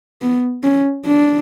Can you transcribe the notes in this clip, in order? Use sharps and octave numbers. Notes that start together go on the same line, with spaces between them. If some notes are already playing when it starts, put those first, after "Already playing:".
B3
C#4
D4